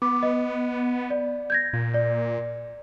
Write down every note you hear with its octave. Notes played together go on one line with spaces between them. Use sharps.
B3 D6
D#5
D5
G6 G#6 A#6
A#2
D5